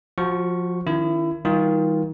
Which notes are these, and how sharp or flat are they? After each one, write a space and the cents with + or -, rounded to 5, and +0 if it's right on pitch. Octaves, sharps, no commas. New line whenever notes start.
F3 +20 F#4 +0 C#6 +0
D#3 +0 C#4 -5 E4 +25
D#3 +35 G3 +0 F4 +0